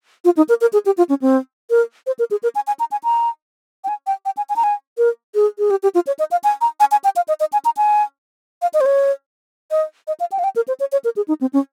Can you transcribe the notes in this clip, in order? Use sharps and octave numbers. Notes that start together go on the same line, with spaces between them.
F4
D#4
A#4
A#4
G#4
G4
F4
C#4
C4
A#4
C5
A#4
G#4
A#4
G#5
G#5
A#5
G#5
A#5
G5
G#5
G5
G5
G#5
G#5
A#5
G#5
A#4
G#4
G#4
G4
G4
F4
C#5
D#5
F5
G#5
A#5
G#5
G#5
G5
F5
D#5
D#5
G#5
A#5
G#5
F5
D#5
C5
C#5
D#5
D#5
F5
G5
F5
G5
A#4
C5
C#5
C#5
A#4
G#4
D#4
C4
C#4